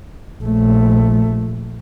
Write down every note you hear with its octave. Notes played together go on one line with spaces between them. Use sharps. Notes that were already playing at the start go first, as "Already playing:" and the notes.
A#1 A3